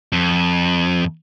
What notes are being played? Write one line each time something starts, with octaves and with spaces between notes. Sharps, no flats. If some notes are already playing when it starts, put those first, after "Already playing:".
F2